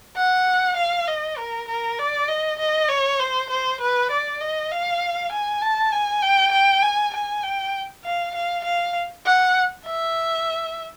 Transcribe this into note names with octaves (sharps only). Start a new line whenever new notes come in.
F#5
F5
D#5
A#4
A#4
D5
D#5
D#5
C#5
C5
C5
B4
D5
D#5
F5
G#5
A5
G#5
G5
G5
G#5
G#5
G5
F5
F5
F5
F#5
E5